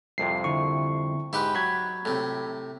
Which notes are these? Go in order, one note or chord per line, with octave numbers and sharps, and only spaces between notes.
C2 F2 C3 C7
D3 E4 C#6
G#2 E4 G4 B4
F#3 B5 G#6
A2 C3